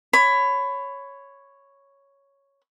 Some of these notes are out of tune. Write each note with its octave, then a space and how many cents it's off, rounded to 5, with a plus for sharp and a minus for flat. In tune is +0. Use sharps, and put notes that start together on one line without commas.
C#5 +0 B5 +20